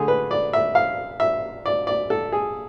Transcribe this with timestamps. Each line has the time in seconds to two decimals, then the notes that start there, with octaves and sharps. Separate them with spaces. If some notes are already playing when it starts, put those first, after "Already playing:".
Already playing: D3 A3 G#4
0.08 B4
0.31 D5
0.53 E5
0.75 F5
1.20 E5
1.66 D5
1.87 D5
2.10 A4
2.32 G#4